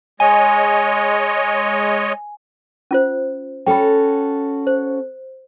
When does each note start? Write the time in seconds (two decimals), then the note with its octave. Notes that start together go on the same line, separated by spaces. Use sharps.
0.20 G#3 C#5 D#5 G#5
2.91 C#4 F4 C5
3.67 C#4 F#4 A4 G5 B5
4.67 C5